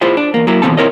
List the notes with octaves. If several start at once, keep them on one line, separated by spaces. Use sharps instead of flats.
E4 F4 G#4 C5 E5
D4
E2 A#3
F#3 A#3 E4
D#2 B2 E3 C4 A4 A5
C4 E4 A#4 C#5 D#5